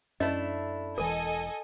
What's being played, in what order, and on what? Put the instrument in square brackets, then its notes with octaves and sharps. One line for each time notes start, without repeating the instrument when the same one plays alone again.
[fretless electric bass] F#2 [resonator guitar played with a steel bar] A3 D4 E4 [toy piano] C#4 D#5
[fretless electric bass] E1 E3 [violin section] A4 D#5 G#5 [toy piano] A#4